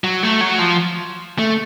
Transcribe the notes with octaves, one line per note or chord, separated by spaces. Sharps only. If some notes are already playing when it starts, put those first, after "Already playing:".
F#3
A3
F#3
F3
A3